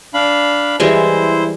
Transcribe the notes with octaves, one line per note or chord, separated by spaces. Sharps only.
D4 F5 B5
E3 G3 G#3 E4 C5